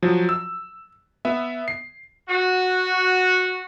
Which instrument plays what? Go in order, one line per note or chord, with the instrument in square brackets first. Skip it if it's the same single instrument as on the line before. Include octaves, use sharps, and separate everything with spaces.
[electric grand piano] F3 F#3
E6
B3 E5
C7
[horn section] F#4